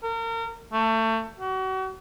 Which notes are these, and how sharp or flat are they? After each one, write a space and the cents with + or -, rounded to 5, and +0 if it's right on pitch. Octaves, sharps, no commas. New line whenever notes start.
A#4 -35
A3 +25
F#4 +35